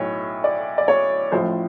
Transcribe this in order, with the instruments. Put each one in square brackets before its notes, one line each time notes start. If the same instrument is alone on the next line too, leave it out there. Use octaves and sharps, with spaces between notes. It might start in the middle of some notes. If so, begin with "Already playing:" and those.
Already playing: [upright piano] B1 A2 C#5
D5
D5
C#5
A1 A2 F3 C5